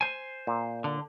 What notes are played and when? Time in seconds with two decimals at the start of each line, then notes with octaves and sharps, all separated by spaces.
0.01 C5 G#5
0.47 A#2
0.84 D3